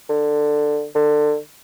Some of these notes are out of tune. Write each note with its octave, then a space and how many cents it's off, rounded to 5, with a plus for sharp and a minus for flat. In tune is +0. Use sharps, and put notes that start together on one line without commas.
D3 +15
D3 +25